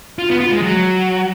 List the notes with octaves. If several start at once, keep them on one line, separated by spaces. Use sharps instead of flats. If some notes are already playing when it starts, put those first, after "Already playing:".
F4
B3
F4
G#3
F#3